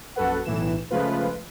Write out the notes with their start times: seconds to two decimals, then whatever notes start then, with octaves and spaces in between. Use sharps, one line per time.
0.16 A#1 F#2 F#4 A4 B4 F#5
0.45 B1 A2 E3 E7
0.90 C#3 F3 G#3 A3 F4 B4